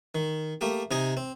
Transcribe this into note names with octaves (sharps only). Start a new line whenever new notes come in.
D#3
A3 A#3 G4
C3 D#4 D#5 G#5
C4